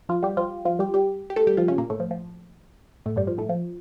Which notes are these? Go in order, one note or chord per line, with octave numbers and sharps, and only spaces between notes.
F3 F4
G3 G4
F3 F4
F3 F4
G3 G4
G3 G4
G4
A3 A4
G3 G4
F3 F4
C#3 C#4
A#2 A#3
A2 A3
F3
F3
A2 A3
G2 G3
F3
A2 A3
F3